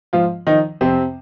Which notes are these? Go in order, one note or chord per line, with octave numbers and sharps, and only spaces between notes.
G#2 F3 F4
D#3 F3 D#4
F2 C3 C4